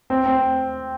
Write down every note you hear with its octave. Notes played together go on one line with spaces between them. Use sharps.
C4
C4